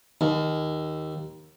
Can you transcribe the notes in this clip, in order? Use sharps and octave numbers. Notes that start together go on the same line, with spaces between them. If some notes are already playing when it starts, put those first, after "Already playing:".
D#2